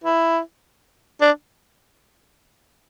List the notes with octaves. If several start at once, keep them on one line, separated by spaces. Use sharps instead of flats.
E4
D4